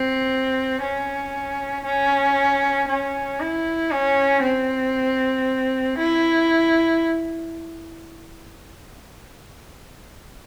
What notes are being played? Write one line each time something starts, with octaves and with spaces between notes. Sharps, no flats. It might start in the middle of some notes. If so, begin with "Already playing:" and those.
Already playing: C4
C#4
C#4
C#4
E4
C#4
C4
E4